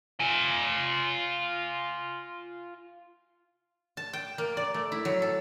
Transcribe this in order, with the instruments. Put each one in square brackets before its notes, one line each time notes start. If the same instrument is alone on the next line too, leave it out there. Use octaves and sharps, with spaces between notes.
[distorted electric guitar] F4 G#5
[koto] A5
G5
A#3
D5
A3
E4
F#3
A4